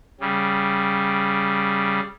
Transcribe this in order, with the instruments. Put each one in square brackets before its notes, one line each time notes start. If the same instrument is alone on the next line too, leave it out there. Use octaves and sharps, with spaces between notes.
[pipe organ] C#3 G3